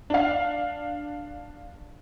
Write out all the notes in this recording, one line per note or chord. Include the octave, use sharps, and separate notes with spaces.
D4 F5